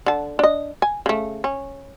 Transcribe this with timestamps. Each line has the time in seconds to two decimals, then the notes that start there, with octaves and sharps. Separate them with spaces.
0.06 D3 A5
0.39 D4 D#5
0.82 G#5
1.06 C#3 A3
1.44 C#4